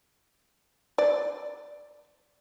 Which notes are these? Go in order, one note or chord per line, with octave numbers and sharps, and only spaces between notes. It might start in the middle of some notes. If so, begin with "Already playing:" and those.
D5